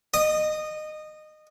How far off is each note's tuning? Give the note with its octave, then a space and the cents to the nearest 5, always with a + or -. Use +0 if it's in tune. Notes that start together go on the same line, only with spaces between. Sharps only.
D#5 -20